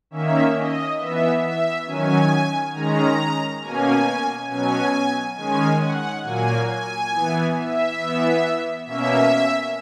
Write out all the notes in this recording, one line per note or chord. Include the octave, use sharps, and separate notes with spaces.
D#3 A#3 C#4 E5
D#5
E3 B3 E5
E5
D#3 F#3 C#4 G#5
D#3 G#3 C#4 A#5
B2 A#3 C#4 G#5
B2 F#3 C#4 G#5
D#3 G#3 C#4 G#5
F#5
A#2 F#3 A#3 G#5
G#5
E3 B3
E5
E3 B3
B2 A#3 C#4 E5